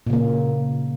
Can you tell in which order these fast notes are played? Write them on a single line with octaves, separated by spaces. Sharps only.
A#2 C#3 A#3